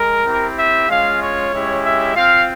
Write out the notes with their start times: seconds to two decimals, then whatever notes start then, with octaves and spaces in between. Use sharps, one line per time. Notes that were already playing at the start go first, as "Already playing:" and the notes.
Already playing: G#3 A#4
0.26 C4 E4 G4
0.58 E5
0.89 G#3 C#4 F4 F5
1.20 C#5
1.52 G#3 C#4 E4 G4
1.83 E5
2.15 C4 F4 F5